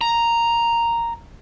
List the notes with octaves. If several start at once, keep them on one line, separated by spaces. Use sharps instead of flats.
A#5